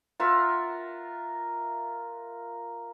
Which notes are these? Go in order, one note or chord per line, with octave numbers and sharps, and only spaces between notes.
F4 A#4 E5 F#5